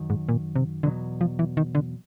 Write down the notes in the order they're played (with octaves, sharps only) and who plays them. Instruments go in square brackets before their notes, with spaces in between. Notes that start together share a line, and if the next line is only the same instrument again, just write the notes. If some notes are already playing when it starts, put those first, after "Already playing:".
Already playing: [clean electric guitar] F#2 D#3 F#3
[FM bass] G#2
A#2
C3
[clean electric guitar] E2 B2 F#3 [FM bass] D3
[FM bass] F3
E3
D#3
D3